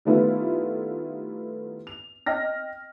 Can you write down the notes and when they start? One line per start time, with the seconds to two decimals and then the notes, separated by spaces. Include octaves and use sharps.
0.05 D#3 G3 A3 B3 E4 F4
1.87 F7
2.26 D#5 G5 F6 A#6